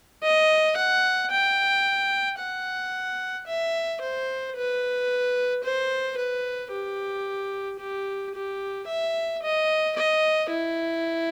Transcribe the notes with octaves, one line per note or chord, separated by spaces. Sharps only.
D#5
F#5
G5
F#5
E5
C5
B4
C5
B4
G4
G4
G4
E5
D#5
D#5
E4